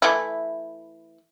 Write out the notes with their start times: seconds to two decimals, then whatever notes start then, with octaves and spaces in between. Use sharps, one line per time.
0.02 E3 A3 E4